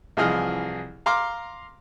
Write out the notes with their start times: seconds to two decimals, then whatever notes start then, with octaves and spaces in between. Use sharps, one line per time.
0.17 C2 E3 F3 G#4 D#5 F6
1.06 F5 A#5 C6 D6 F6